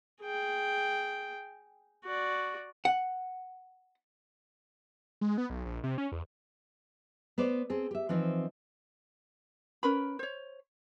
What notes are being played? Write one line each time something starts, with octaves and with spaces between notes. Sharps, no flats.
G#4 G5
F#4 D5
F#5
G#3
B3
B1
A#1
C3
C#4
E2
B3 B4 C5 D5
C4 G#4 A4
G4 E5
E3 F3 C4 D#4 C5
C#4 A#4 B4 B5
C5 C#5